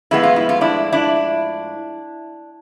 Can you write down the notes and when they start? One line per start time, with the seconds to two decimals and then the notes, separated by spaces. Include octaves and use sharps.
0.11 A2 F3 G#3 B3 E4
0.23 F4
0.36 E4
0.49 F4
0.61 D4 E4
0.92 D4 E4